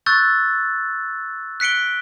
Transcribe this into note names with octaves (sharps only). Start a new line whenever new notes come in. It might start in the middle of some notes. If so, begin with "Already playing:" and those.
C#6 E6 F#6 G6 A6
F#6 B6 C#7 D7 G7